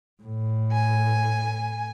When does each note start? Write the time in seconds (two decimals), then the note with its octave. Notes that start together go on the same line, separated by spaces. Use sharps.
0.23 A2
0.72 G#5